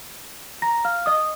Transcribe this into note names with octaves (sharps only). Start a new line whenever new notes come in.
A#5 A#6
F5 F6
D#5 D#6